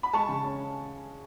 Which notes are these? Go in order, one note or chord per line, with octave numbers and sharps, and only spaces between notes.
B5
G#3 A5 C#6
C#3
C#4